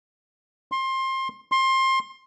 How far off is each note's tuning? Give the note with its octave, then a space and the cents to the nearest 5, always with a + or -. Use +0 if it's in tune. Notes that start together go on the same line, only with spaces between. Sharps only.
C6 +25
C6 +25